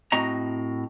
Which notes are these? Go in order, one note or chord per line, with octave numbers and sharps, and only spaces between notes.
A2 C4 F#4 D#5 A#5